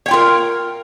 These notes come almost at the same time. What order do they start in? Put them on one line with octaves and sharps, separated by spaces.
C#5 G5 F4 A#4